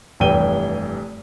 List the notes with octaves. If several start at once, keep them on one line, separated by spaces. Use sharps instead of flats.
F1 G2 E3 G5 D#7 G7